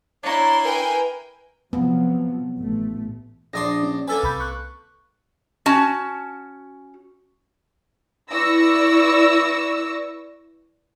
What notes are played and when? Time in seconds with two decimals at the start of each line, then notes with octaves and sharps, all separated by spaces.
0.23 D4 E4 C#5 A#5 C6
0.64 A#4 B4 G5 G#5
1.73 C3 F3 F#3 B3
2.58 A1 A3
3.53 A#1 D4 C6 D#6 A#6
3.83 C#4
4.08 A#3 A4 B4 G#5 E6 A6
4.23 C2 B5 G6
4.40 C#6 F#6
5.66 C#4 F#4 A5
8.30 E4 B4 D5 C#6 E6 A#6